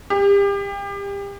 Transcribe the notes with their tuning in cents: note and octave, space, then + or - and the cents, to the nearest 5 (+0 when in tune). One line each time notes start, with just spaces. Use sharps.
G4 +30